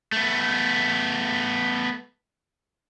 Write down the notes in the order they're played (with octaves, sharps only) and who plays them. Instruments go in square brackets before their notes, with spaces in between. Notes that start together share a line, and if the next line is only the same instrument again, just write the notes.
[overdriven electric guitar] A3 B3